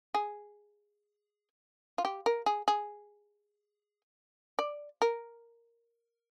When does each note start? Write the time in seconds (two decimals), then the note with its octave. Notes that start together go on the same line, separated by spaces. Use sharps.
0.14 G#4
1.98 F4
2.05 G4
2.26 A#4
2.46 G#4
2.68 G#4
4.59 D5
5.02 A#4